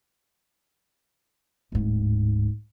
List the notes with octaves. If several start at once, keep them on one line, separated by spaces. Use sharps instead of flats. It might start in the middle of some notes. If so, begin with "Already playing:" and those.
D1 G#2